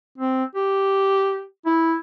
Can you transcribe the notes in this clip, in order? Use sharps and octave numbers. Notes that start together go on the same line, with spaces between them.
C4
G4
E4